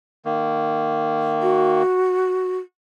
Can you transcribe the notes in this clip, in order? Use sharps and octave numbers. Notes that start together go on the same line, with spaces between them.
D#3 A#3
F#4